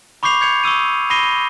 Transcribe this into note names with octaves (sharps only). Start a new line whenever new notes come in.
B5 C#6 D6 G6 C7 F7
G6 G#6 C#7 F7
C#6 D#6 E6 D#7
B5 D#6 A#6 C7 D#7 G7